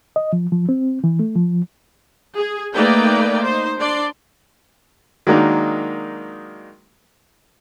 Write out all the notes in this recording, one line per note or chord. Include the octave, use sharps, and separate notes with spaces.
D#5
F3
F3
C4
E3
A3
F3
G#4
A3 A#3 D#4 B4 D5 G5
D#4 C5
D4 D5 C6
D#3 F#3 G#3 A#3 D4 D#4